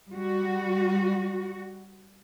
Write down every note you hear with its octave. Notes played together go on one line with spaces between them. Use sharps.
G3 F#4